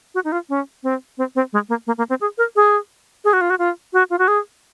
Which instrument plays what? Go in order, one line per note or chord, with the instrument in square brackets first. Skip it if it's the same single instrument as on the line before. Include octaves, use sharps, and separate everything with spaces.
[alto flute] F#4
D#4
F4
C#4
C4
C4
C4
G#3
A#3
A#3
A#3
C4
G#4
A#4
G#4
G#4
F#4
F4
F#4
F4
F#4
F4
F#4
G#4